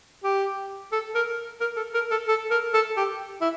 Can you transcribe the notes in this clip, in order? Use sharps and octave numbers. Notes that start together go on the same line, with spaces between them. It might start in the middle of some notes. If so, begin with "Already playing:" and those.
G4
A4
A#4
A#4
A4
A#4
A4
A4
A#4
A4
G4
E4